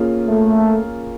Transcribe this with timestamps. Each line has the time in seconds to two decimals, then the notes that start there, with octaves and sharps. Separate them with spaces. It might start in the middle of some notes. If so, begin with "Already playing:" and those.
Already playing: A#3 C#4 F4 G#4
0.28 A3